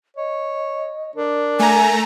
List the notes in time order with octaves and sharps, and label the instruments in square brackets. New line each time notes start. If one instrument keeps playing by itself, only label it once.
[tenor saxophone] C#5 [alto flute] D#5
[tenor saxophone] D4 [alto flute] A#4
[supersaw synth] A3 A#5 [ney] G#5